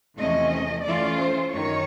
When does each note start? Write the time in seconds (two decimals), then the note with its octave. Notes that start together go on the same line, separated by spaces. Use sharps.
0.17 E2 C3 F3 A3 C#4 D#5
0.84 E3 A3 C#4 F4 D5
1.19 C5
1.52 F#2 D#3 C#5